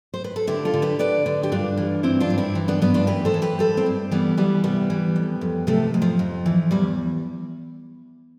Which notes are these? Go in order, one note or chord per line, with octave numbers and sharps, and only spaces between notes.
C5
B4
A4
D3 E4 G4
F4 A4
D3
G4 B4
D3 B4 D5
D3
G4
G2 D4 F4
E3
G2 C4 E4
D4 F4
G2
C4 E4
E3
B3 D4
G2 B3 D4
D4 F4
E3 G4 B4
A4 C5
E3
G4 B4
G2 A4 C5
C4 E4
G2
E3 G3 B3
E3 G3 B3
C3 G3 B3
E3
F2
F2
C3 F3 A3
F2
F3
F2
E3
E2 G3